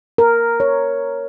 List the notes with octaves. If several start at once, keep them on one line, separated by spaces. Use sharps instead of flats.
A#4
C#5